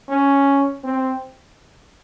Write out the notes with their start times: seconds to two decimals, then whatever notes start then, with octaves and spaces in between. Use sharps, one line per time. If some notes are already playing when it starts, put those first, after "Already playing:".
0.09 C#4
0.84 C4